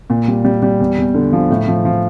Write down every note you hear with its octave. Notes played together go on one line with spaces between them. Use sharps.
A#2
G3
G3
G3
E2
E2
D3
F3
A2
F3
F3